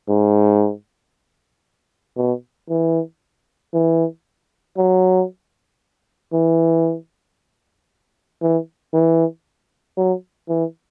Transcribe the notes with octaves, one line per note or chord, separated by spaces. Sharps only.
G#2
B2
E3
E3
F#3
E3
E3
E3
F#3
E3